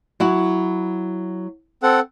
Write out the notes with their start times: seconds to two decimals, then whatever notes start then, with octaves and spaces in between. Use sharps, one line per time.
0.20 F#3 E4 F#4
1.83 C4 A4 F#5